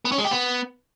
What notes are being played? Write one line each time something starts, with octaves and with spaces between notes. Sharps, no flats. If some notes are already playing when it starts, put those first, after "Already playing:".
B3
C#4
G#3
G4
B3